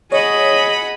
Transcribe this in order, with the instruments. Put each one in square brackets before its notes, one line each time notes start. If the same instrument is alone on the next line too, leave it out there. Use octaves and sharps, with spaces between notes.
[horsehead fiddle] G#4 D#5 [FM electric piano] C#5 [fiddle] F#5 B5